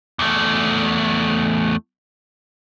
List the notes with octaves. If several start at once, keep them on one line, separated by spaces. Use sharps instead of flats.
E2 A3